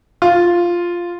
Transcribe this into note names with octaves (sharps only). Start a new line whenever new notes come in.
F4